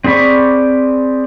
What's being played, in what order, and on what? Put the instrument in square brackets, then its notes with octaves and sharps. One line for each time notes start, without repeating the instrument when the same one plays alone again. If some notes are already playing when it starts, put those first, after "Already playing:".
[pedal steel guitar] C4 G#4 D5 B5 C#6